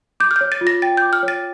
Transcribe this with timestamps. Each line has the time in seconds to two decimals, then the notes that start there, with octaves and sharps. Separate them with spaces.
0.20 D6 G6
0.31 F6
0.36 C#5 G6
0.52 A6
0.61 F4
0.67 A#6
0.82 G5 A6
0.97 D6 G6
1.13 F6
1.23 C#5
1.28 A6